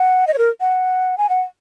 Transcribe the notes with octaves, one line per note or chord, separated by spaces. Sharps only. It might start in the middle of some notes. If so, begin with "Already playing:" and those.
Already playing: F#5
D#5
C#5
A#4
F#5
G#5
F#5